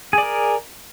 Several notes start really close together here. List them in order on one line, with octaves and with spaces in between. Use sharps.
G#4 D5 A#4